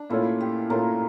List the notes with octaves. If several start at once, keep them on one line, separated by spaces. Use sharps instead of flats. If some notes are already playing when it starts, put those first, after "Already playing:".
Already playing: D4
A#2 A3 C#4 E4 F4
G4
A#2 A3 C#4 F4 A#4